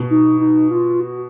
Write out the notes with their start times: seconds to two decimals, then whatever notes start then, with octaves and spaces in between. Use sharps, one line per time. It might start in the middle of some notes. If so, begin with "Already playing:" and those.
Already playing: B2
0.10 D#4
0.40 D#4
0.70 F4
1.00 F#4